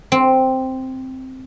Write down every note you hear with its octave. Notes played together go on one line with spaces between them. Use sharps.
C4